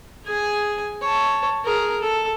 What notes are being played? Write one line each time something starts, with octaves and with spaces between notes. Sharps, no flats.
G#4 G#5
C#5 A5
G#4 A#4
A4